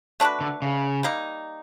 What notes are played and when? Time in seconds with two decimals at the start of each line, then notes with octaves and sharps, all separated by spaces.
0.20 A3 D4 F#4 B4
0.41 D3
0.62 C#3
1.03 G3 A#3 D#4